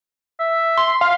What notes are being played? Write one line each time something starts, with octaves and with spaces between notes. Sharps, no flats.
E5
C6
F5